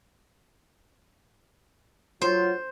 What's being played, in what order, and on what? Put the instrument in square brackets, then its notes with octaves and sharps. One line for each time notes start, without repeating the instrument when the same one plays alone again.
[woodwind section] F#3 F4 [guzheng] C5